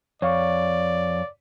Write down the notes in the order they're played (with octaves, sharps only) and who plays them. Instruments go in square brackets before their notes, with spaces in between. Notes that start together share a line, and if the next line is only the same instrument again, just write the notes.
[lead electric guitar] F2 [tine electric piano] C#5 F5 C#6 [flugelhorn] D5